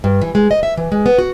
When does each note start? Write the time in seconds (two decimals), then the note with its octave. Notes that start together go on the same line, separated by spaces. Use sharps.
0.04 G2
0.22 E3
0.35 G#3
0.51 D#5
0.63 E5
0.77 E3
0.92 G#3
1.06 B3
1.18 F#4